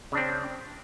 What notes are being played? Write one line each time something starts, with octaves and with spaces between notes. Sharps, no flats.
C#3 C4 D4